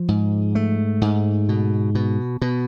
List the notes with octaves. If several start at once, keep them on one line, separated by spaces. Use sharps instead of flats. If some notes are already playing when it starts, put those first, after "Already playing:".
Already playing: F3
G#2
A3
G#2
B2
B2
B2